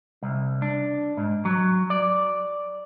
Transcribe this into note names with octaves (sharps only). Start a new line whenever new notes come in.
C2
D4
G#2
F#3
D5